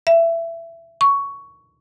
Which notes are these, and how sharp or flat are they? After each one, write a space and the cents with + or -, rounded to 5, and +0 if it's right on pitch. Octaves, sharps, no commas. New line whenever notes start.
E5 +20
C#6 +10